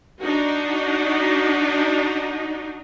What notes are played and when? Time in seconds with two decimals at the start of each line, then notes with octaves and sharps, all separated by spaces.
0.20 D4 D#4 F#4